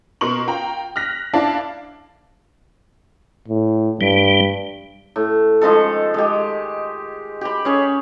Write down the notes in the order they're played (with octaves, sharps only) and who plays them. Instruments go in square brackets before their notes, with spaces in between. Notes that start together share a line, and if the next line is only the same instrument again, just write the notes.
[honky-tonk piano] B2 A#4 C6 C#6 F#7
F4 G5 A#5
F6 F#6 A#6 B6
D4 E4 F5 A5 D6
[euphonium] A2
[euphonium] G2 [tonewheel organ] G3
[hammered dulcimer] A2
D#3 F3 G#3 A4
G#3 G4
G4 B5
C#4 G#4 C#5